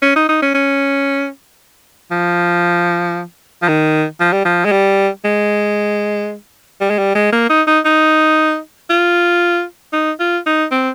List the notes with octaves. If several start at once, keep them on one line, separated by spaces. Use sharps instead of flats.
C#4
D#4
D#4
C#4
C#4
F3
F3
D#3
F3
G3
F3
G#3
G3
G#3
G3
G#3
G3
G#3
A#3
D#4
D#4
D#4
F4
D#4
F4
D#4
C4